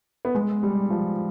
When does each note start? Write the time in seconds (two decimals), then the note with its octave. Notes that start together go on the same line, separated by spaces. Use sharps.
0.25 B3
0.35 G#3
0.63 G3
0.90 F3